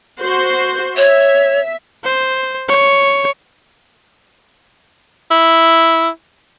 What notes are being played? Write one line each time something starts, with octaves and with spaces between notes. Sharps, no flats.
F#4 C5
C#5 E5
C5
C#5
E4